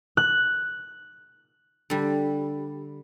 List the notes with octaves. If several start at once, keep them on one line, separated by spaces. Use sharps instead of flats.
F#6
D3 G3